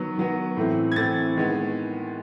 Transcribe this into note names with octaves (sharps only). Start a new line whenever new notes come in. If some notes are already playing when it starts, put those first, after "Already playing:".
Already playing: D#3 F#3 B3
D#3 F#3 B3
A2 E3 A3 C4
G#6
A2 E3 A3 C4 A6
D#3 G#3 B3